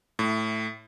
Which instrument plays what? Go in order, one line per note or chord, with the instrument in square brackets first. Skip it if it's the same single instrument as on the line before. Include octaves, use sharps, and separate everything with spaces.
[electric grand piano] A2